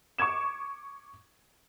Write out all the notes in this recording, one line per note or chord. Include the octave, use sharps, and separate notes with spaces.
C#6 D6 G#6 E7